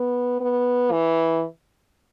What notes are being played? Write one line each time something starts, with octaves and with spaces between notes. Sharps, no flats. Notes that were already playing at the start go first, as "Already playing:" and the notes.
Already playing: B3
B3
E3